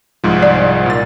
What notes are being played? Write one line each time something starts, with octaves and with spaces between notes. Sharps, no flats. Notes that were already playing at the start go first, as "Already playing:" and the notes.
C2 G#2 F3
D5
A#2 A6